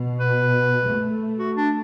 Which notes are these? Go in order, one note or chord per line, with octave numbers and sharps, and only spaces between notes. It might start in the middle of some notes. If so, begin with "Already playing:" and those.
Already playing: B2
B4
A3
F#4
D4